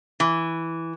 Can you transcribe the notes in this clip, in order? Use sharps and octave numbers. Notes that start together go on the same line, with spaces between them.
E3